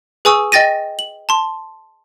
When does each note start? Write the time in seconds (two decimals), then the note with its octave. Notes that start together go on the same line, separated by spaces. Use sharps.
0.25 G#4 B4 G#5 C#6 D#6 E6
0.52 D#5 G5 A6 A#6 D#7
0.99 F#7
1.29 A5 C6